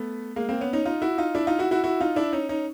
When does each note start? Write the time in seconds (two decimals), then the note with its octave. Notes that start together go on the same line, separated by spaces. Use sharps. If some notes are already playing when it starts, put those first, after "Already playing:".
Already playing: A3 B3
0.36 G#3 A#3
0.49 A#3 C4
0.61 B3 C#4
0.73 C#4 D#4
0.85 D#4 F4
1.02 E4 F#4
1.18 D#4 F4
1.35 D4 E4
1.47 D#4 F4
1.59 E4 F#4
1.71 E4 F#4
1.84 E4 F#4
2.00 D#4 F4
2.16 D4 E4
2.33 C#4 D#4
2.49 C#4 D#4